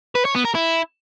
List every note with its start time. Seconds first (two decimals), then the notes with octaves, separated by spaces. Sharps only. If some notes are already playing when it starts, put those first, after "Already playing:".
0.15 B4
0.25 C#5
0.35 B3
0.45 A#4
0.54 E4